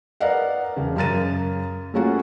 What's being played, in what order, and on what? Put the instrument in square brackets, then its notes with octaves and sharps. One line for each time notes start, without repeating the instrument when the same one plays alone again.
[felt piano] A#4 B4 D5 D#5 F5 F#5
E1 C#3
F#2 C#3 A#4 A6 D#7
A3 A#3 C#4 F4 F#4 G#4